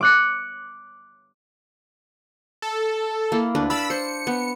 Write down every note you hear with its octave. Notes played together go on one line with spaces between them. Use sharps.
D6 F#6 C#7
A4
A#3 E4
D2 D4 B4
D5 F5 A5 B5 E6
C5 C#7
B3